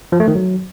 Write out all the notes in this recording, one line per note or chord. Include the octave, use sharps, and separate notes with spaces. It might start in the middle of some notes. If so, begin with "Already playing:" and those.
F3
A3
D#3
F#3